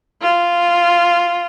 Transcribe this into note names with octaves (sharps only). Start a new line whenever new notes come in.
F4